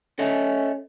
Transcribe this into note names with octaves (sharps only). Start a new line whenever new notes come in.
C#4 A4 D#5 E5